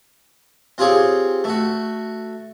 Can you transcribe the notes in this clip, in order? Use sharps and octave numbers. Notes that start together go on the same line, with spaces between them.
C4 F4 G4 G#4 C#5
A3 F#4